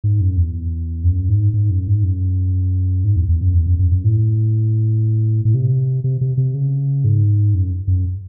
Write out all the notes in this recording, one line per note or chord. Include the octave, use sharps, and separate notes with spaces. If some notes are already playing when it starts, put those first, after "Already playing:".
G#2
F#2
E2
F#2
G#2
G#2
F#2
G#2
F#2
G#2
E2
E2
F#2
E2
F#2
F#2
F#2
A2
A2
C3
C3
C3
C3
C#3
G#2
F#2
F#2